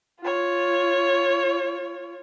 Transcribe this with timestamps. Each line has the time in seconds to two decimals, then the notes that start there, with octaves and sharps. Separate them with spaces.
0.21 F4 C#5